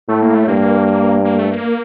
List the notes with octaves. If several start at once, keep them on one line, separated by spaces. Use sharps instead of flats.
A2 A3
A#3
A3
G2 A#3
A#3
A3
A#3